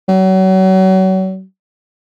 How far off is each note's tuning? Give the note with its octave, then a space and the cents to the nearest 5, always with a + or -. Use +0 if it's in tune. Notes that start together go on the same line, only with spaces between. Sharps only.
F#3 +35